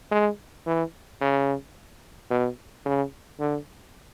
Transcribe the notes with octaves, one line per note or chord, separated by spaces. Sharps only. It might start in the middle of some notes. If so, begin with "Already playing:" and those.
G#3
E3
C#3
B2
C#3
D3